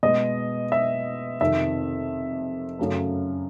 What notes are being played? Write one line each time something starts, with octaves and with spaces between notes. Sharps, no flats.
B2 G#3 D#5
E5
F2 C3 D#3 E5
F#2 C#3 F#3 A3